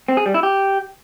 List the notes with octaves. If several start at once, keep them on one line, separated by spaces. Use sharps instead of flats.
C4
G#4
G3
E4
G4